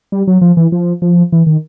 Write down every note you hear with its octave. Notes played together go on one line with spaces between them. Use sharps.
G3
F#3
F3
E3
F3
F3
E3
D#3